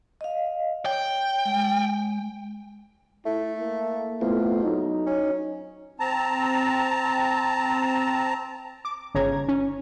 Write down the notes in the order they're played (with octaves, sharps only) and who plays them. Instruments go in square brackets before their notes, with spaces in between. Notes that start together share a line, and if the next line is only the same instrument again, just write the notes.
[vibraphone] D#5 F5
[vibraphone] C#5 [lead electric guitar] G5
[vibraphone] G#3
[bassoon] A3 [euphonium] E4
[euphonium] A#3
[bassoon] F2 [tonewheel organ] A3 B3 F4 [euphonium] E4
[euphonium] F#3 [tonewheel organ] D#4
[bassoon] C#4
[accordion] C4 A5 A#5
[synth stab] D6
G1 C#3 C#5 A#5 G#6
C#4